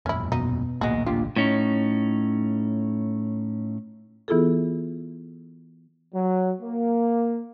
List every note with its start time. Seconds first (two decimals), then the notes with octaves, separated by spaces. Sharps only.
0.06 E1 F#2 A#2 C#4 E4
0.32 B2 D#4
0.81 A1 D2 A#2 A#3 F#4 G#4 D#5
1.06 A#3 D4 F4 G4
1.36 A2 C#4 D#4
4.28 E3 B3 E4 F4 G#4 A4
6.13 F#3
6.60 A#3